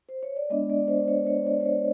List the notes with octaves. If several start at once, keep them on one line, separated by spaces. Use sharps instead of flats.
C5
C#5
D5
G#3 B3 D4 D#5
D5
C5
C#5
C#5
D5
C5
C#5